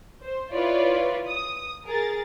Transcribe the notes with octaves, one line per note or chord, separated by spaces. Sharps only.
C5
E4 F4 B4 C#5 D5
D#6
G#4 A#4 A6